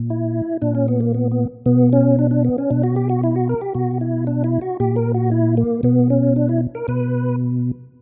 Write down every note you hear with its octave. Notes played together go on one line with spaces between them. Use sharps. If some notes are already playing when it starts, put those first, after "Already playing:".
Already playing: A#2
E4
A#2 D4
C#4
B3
A#3
B3
B3
B2 B3
C#4
D4
D4
B3
C#4
B2 D4
F#4
G4
F#4
E4
F#4
A#4
G4
B2 F#4
E4
D4
E4
F#4
A#2 G4
A#4
F#4
E4
A#3
B2 B3
C#4
D4
E4
A#4
B2 B4